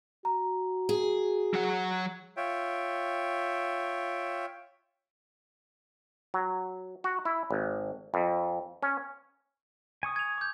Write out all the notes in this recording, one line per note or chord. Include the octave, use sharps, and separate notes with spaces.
F#4 A#5
G#4
F#3 F#5
F4 C#5 E5 G5
F#3
F#4
E4
G#1
F2
C#4
G#5 C#6 D#6
G#6 F7
D6 G6